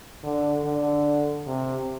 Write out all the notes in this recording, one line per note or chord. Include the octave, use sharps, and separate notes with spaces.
D3
D3
C3